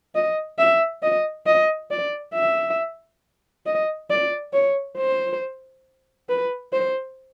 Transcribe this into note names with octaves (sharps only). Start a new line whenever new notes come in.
D#5
E5
D#5
D#5
D5
E5
D#5
D5
C#5
C5
B4
C5